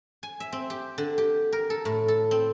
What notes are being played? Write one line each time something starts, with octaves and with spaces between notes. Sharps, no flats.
G#5
E5
C4
G4
D3
G4
A#4
A4
A2
A4
C4